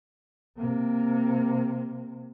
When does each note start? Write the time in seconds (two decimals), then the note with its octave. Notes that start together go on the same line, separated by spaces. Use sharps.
0.57 C3 A#3